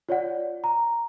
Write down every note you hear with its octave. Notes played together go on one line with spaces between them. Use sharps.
F4 C#5 D5 F#5
A#5